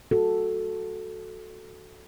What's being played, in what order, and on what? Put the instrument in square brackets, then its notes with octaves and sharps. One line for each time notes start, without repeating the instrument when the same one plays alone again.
[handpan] F#4 A4